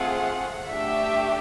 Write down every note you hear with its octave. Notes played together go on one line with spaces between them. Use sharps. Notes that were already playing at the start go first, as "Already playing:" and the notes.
Already playing: A3 C4 F4 G#4 F#5
A3 D4 G4 E5